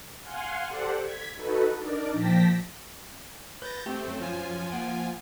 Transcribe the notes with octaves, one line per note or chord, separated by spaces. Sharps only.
F5 F#5 G#5 C6
G4 A4 C5 D5 F#5
G#6 B6
D#4 F#4 A4 B4
D4 D#4 A#4 D5
A#2 F3 G5 A5 A#6 B6
B4 G6 A6 A#6
A3 C4 G4
F#2 C#4 C5
F3 F4 G#5
A#3 F#5 G5